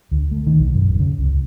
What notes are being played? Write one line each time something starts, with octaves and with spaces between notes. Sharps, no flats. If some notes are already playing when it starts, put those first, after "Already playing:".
D2
A3
D#3
B1
F#2
D#1
C#3
C#2